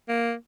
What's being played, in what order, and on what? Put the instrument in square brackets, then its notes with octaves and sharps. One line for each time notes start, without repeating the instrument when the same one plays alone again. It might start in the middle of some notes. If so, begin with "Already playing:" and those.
[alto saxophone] A#3